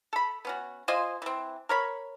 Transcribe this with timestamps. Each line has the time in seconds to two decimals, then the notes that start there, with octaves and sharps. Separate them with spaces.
0.13 A4 B5
0.45 B3 C#4 F#4
0.88 F4 C5 D#5 G#5
1.22 E3 C4
1.69 A#4 C#5 B5